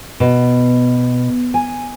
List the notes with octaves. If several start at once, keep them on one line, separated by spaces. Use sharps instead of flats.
B2
G#5